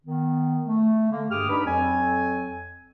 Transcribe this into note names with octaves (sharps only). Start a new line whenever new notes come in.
D#3 B3
A3
D3 A#3
G2 G4 G#4 D6 D#6 F6
D4 D#4 B4 B5
F2 F#3 C4 A4 G#5